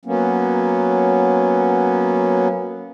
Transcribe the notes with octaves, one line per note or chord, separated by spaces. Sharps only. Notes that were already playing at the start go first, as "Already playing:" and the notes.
F#3 A#3 B3 C#4